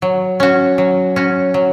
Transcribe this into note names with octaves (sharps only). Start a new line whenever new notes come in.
F#3
C#4 F#4
F#3
C#4 F#4
F#3